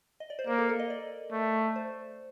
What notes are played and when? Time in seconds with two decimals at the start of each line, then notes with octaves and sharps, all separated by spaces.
0.20 D#5
0.30 D5
0.39 C5
0.47 A#3 A#4
0.58 A4
0.69 A4
0.79 D#5
0.90 D5
1.32 A3
1.76 C5